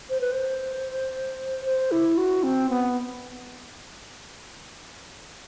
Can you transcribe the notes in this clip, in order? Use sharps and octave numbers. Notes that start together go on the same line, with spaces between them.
C5
B4
C5
C5
E4
F#4
C4
B3